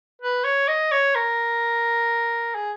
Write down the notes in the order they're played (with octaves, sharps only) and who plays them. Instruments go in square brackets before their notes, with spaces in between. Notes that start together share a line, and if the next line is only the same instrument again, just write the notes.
[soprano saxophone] B4
C#5
D#5
C#5
A#4
G#4